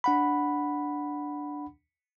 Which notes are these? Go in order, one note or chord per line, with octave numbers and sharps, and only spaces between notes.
D4 F#5 B5